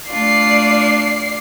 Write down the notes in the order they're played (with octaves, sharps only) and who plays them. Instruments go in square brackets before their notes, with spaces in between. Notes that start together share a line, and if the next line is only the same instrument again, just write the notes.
[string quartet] A3 D4 F4 [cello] D5 [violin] C7